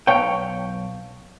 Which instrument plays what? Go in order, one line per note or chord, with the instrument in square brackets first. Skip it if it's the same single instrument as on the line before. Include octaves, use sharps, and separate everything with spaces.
[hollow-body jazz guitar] B1 C#5 G5 [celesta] F5 A5 D7